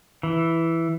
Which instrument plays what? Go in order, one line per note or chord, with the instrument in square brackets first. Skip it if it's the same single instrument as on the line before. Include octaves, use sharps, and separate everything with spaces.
[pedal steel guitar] E3